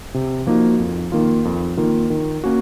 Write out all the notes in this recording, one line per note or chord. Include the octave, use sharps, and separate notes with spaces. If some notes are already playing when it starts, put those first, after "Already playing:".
C3
F3 A#3 D#4 F#4
F2
D#3 A#3 F4
F2
D#3 A#3 F4
D#3
A#3 C#4 F#4